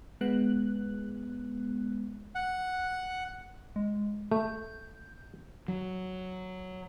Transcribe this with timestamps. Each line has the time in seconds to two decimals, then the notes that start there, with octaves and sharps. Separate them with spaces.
0.21 G#3 B3 F#6
2.35 F#5
3.76 G#3
4.31 A3 G6
5.68 F#3